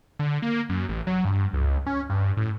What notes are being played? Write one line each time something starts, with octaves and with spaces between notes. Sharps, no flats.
D3
A#3
F#2
A1
F#3
G2
C#2
C#4
G2
A2